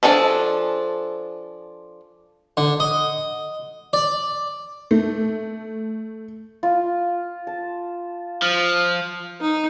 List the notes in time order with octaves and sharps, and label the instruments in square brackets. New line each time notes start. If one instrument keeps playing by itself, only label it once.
[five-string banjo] F3 D4 D#4 G#4 A4
[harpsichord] D3
D#5
D5
[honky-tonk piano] A3
[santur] F4
A5
[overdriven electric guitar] F3
[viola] D#4